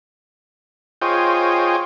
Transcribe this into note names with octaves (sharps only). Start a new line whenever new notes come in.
F4 G#4 C5 C#5 D#5 G5